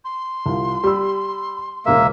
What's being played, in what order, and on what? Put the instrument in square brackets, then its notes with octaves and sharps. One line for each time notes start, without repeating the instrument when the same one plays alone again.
[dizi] C6
[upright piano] C2 F4
[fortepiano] G3 [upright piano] B5 E6
[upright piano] E1 C#2 G#3 [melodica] A#3 E5